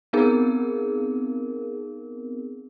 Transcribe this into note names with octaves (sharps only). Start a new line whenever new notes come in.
B3 C4 D#4 G#4 A#4